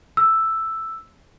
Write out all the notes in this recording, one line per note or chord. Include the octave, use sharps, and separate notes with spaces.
E6